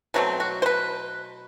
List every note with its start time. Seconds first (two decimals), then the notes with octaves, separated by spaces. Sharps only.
0.14 B2 F#3 A3 C4 D4
0.40 F#4
0.62 C5
0.66 B4